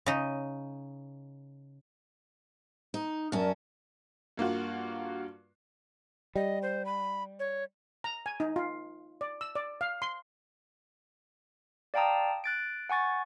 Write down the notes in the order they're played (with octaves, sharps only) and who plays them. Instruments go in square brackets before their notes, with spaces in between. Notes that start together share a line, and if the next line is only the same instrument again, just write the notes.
[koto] C#3 D#4
[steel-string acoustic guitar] D#4
[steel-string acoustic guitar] F#2 C#4 [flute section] A#4 D5 A5
[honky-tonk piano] G2 A#3 F4 F#4
[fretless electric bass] G3 [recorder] D#5
[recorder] C5
B5
C#5
[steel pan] A#5
G#5
D#4
F4
D5
E6
D5
F5
C6
[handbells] D5 F5 G5 A5 A#5 D#6
F#6 A6 D7
F#5 G#5 C#6 A6